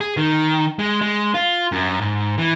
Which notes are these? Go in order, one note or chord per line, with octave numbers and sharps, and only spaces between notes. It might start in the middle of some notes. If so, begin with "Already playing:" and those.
G#4
D#3
G#3
G#3
F4
F#2
G#2
E3